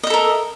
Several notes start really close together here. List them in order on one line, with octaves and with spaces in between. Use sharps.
D#5 E5 A4 A#4